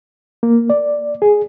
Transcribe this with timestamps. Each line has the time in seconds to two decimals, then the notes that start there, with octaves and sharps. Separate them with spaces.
0.43 A#3
0.70 D5
1.22 G#4